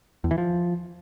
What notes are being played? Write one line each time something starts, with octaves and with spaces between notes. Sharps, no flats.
E2
E3
F3